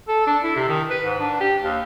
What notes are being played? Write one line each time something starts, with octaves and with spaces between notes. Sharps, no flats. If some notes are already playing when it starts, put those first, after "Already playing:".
A4
D4
E4
C3
D#3
B4
G#2
D4
G4
D#2